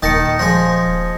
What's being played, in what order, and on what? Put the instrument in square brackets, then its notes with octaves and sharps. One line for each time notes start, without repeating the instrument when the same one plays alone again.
[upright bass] D#1 [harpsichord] D#3 A5 [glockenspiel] D#6 A#6 C#7
[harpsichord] F3 G#3 [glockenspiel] A#6